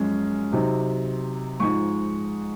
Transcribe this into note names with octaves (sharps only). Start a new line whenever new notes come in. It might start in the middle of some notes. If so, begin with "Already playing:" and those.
Already playing: F#2 F3 G#3 C#4
C3 F#3 C4 D#4
G#2 F3 G#3 D#4 C#6